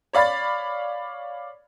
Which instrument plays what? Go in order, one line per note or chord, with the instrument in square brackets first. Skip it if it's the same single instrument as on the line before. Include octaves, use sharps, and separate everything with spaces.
[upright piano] C#5 D5 F5 B5 A6